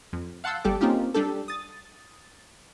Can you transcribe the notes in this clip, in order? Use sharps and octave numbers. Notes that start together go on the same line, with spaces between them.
F2
F5 F#5 A5 C6 E6 G6
G1 G3 G4 A4 D6
A#3 C4 C#4 D#4 F4 G4
G3 D4 G4 A4
D#6 A6